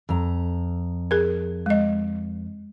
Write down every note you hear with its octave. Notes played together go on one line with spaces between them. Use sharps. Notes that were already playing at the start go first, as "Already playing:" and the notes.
F2 A#5
G#4 A#4
G#3 D#5